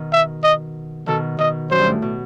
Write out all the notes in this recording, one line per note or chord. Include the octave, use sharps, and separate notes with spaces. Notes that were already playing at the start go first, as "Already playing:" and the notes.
Already playing: B2 D#3
E5
D#5
B2 D#3 A4
B2 D#5
F#2 C5
G2
A2
B2